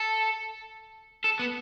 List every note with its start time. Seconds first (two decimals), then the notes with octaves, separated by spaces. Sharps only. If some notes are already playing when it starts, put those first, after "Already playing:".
Already playing: A4
1.24 A4
1.39 B3